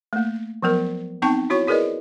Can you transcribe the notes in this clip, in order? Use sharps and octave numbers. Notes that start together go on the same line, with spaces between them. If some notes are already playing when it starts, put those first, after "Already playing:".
A3 A#3
F3 F#3 B3 A#4
B3 C4 D#4 G5 A5 C#6
E4 F#4 C#5 C#6
E4 G#4 A#4 B4 D5 D#5